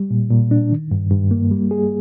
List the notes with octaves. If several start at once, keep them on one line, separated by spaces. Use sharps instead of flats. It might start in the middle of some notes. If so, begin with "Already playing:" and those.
Already playing: G3
A#2
A#2
D4
D#3
G2
G2
A#3
G3
G#4